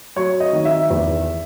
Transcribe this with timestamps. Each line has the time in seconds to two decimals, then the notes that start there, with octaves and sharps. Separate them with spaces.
0.16 F#3 C#5
0.40 D#5
0.53 D#3
0.65 E5
0.90 E2